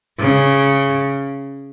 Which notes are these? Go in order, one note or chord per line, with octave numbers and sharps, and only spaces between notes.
C#3